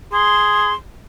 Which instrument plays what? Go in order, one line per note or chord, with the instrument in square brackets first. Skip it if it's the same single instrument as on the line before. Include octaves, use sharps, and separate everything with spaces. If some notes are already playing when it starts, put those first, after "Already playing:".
[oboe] G#4 [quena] C6